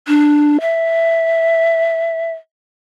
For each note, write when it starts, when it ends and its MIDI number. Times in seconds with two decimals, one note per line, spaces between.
0.08 0.60 62
0.61 2.31 76